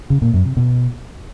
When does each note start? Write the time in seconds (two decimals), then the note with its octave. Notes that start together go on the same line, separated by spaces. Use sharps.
0.10 C#3
0.22 A#2
0.33 F#2
0.45 C3
0.57 B2